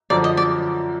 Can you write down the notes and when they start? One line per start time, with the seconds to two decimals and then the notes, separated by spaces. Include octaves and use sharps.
0.10 F#2 D3 F3 D5
0.24 D#5
0.37 D5